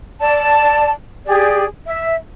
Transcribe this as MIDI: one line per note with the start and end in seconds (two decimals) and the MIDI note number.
0.21 0.90 74
0.21 0.90 81
1.25 1.62 67
1.25 1.62 68
1.25 1.62 74
1.85 2.15 76